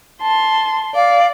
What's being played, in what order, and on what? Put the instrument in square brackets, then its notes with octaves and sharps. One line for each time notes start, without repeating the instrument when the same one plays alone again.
[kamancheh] A5 C6
[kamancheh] D5 [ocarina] F5